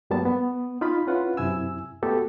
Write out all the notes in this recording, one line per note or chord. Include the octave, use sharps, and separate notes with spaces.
G2 F#3 G3 A#3 B3 A5
B3
D#4 F4 F5 B5
C#4 E4 F4 B4 F#5
F#2 C3 E4 G#5 E6
A3 B3 F#4 G4 A4